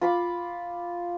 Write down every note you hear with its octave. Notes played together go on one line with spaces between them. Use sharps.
F4 B5 D6